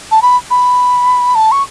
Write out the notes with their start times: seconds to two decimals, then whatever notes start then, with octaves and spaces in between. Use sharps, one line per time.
0.11 A5
0.22 B5
0.51 B5
1.35 A5
1.52 C#6